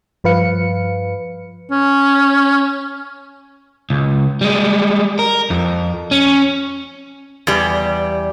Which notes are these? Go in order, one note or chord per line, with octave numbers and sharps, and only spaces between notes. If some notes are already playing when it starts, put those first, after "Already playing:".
G2 F3 B4 F5 C#7
C#4
C#2
G3 G#3
A#4
F2
C#4
E2 G3